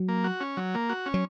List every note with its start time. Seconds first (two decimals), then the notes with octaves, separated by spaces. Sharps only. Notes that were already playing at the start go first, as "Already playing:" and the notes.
Already playing: F#3
0.08 A#3
0.24 F#4
0.41 C#4
0.57 F#3
0.74 A#3
0.89 F#4
1.06 C#4
1.14 F#3